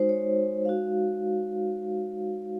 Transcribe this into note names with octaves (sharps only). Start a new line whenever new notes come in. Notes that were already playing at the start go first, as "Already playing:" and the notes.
Already playing: G#3 D#4 F#4 C5
C#5
G#3 D#4 F#4 F5